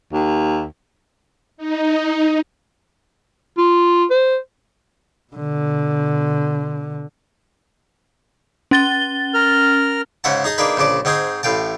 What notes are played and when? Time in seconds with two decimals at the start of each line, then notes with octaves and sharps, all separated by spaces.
0.13 D#2
1.57 D#4
3.58 F4
4.10 C5
5.33 B2 D3
8.71 C#4 A6 G7
9.34 A#4 F6
10.24 G#2 C#3 G#3 E5 F#5 A5
10.44 D#4 G#4 D#5 A5
10.58 A#3 D4 D#4 G#4 B4
10.77 A#1 C#3 D4 D5
11.05 G#2 C4 D#4 G#4 G#5
11.43 A1 A2 F5 G5 A5